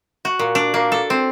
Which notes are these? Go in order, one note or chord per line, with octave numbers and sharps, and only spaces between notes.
F#4
A#2
D4
A#3
A4
C4